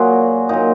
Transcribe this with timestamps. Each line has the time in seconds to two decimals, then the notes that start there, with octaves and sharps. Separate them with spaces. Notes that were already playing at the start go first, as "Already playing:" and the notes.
Already playing: A#2 F#3 F#4 G#4
0.49 A#2 F#3 D#4